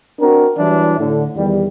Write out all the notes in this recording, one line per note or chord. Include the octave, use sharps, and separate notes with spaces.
C4 D4 F#4 A#4
E3 F#3 G3 D4 E4
A2 D3
E2 D#3 G3